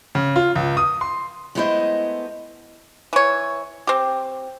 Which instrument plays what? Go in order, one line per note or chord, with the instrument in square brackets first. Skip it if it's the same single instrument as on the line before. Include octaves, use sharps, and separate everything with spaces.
[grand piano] C#3
F4
C#2
D#6
C6
[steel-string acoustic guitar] G#3 A3 B3 E4 C5 D#5
[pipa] E3 C#5
C4 G4